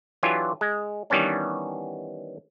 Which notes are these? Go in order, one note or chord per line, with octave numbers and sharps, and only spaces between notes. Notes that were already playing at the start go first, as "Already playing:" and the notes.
E3 F#3 D4 F4 G4 G#5
G#3
D#3 E3 G3 B3 C#4 D4